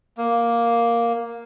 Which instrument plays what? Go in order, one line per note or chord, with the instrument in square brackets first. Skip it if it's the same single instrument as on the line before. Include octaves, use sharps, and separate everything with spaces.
[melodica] A#3